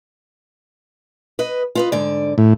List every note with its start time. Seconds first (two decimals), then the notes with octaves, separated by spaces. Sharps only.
1.39 B4 D#5
1.75 F4 B4 D#5
1.92 G#2 D3 D5
2.38 A2